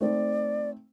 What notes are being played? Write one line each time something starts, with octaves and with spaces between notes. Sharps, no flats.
A3 C4 D#4 D5